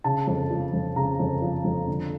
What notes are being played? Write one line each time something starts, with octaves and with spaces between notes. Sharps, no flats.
C#3 A5
F2
F3
F2
C#3 A#5
F2
F3
F2
D3